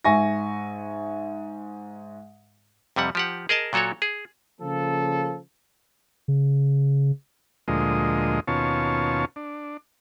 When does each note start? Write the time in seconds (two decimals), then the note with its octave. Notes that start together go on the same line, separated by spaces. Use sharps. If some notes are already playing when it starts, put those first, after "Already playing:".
0.05 G#2 E5 G#5 C#6 A#6
2.96 F2 C3 G3 F#5
3.15 F3 G4 F#5
3.49 G#4 A#4 D#5 A5
3.73 A#2 F#3 F#4 A4 C#5
4.02 G#4
4.60 C#3 F3 A#3 A4
6.28 C#3
7.68 D2 A#2 F3 G#3 D#5
8.48 D#2 B2 C#4 F4 C#5 A5
9.36 D4